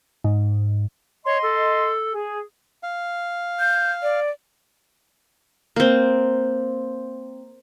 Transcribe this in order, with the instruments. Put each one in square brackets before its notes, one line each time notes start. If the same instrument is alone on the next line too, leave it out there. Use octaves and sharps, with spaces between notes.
[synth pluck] G#2
[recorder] C#5 [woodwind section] D#5 C6
[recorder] A4
[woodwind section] G#4
[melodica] F5
[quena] G6
D5
[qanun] A#3 C4